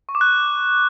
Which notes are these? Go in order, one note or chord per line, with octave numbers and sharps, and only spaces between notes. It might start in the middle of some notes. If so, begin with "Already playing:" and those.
C#6
D6
F#6